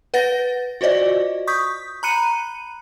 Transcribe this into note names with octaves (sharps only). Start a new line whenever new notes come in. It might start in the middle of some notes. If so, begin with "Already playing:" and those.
B4 F#5 A6 A#6
F4 F#4 C5 D5 D#5
C#6 D#6 G6 B6
A#5 B5 F#6 C#7 D#7